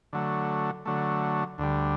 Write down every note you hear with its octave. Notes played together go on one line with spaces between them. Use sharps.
D3 F#3 A3
D3 F#3 A3
D2 D3 G3